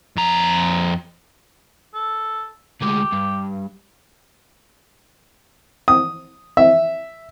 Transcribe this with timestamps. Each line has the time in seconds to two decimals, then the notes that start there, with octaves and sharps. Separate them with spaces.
0.16 F2 A#5
1.94 A4
2.82 D2 G#3 G4
3.13 G2
5.88 D#6
6.57 E5